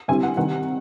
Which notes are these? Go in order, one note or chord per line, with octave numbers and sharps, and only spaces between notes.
D3 G3 C4 E4 G#5
F#5
C3 D#3 G3 F#5